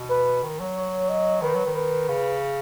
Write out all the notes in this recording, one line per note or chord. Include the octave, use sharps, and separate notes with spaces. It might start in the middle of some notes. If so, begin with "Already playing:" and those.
Already playing: B2
B4
D#3
F#3
C#5
D#5
D#3 B4
F#3
D#3
B4
C#3